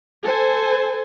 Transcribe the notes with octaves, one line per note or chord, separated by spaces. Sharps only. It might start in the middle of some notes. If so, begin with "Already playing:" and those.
A4 C5 G#5